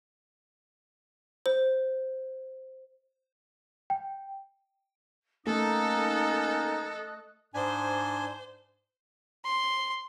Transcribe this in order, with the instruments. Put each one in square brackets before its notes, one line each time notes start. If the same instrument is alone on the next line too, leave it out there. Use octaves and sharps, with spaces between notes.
[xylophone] C5
[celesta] G5
[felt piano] A3 [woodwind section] A#3 C#4 D#4 [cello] A4 [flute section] D#5 D#6 F#6
[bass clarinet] G#2 [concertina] D4 G#5 [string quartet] C5
[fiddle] C6